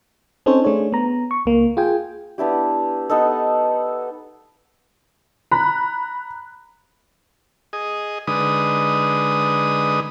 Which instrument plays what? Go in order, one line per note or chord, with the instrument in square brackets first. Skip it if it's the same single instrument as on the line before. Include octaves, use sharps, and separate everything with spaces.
[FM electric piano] C4 C#4 D#4 A4 C5 C#5
A3 D4 G#4 C#5
B3 A#5
C#6
C#2 A#3
F4 G#4 G5 G#5
[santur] B3 D4 E4 G4
B3 D#4 A4
[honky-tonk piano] A#5 B5 F#6
[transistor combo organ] G#4 D#5
D3 G#3 D#4 B4 D#6